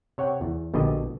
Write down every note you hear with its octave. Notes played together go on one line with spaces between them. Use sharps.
C3 C#5 F#5 G5
E2
A#1 B2 D3 G4 D#5